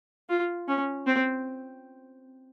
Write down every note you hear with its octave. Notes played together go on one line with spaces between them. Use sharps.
F4
C#4
C4